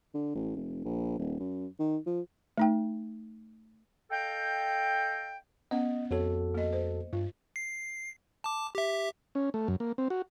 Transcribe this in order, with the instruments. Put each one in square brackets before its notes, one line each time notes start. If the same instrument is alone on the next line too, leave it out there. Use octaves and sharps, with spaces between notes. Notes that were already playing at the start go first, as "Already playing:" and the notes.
[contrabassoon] D3
A1
F1
A#1
D#1
F#2
D#3
F3
[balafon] A3 D#4 G5
[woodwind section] A4 D#5 F5 G5
[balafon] B3 C#4 F#5 [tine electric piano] D#5
[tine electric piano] F2 F#4 A4 [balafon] C#5
[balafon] A#3 D#5
C5
[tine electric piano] G2 [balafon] F4
[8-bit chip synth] C7
A5 D6
G4 E5
[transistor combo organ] C#4
A3
F#2
A#3
C4
F#4